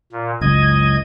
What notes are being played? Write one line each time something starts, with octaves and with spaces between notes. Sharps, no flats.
A#2
F#1 C#2 D#5 G#6